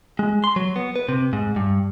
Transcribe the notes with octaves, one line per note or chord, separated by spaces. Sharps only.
G#3
C6
F#3
B3
B4
C3
G#2
G2